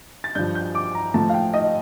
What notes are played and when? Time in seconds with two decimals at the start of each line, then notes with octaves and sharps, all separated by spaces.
0.24 A6
0.35 G2 F3 G6
0.55 G6
0.75 D6
0.95 A#5
1.14 A2 F3 A5
1.29 F5
1.34 G5
1.54 D#5